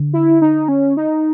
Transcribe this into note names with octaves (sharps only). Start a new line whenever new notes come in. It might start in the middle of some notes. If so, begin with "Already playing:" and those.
Already playing: D3
E4
D#4
C#4
D#4